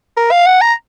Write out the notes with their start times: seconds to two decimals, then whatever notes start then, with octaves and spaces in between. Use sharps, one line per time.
0.17 A#4
0.31 F5
0.47 F#5
0.61 A#5